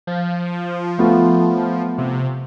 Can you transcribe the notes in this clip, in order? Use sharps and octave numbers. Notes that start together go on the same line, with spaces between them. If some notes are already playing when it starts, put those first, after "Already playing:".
F3
A3 B3 F4
C3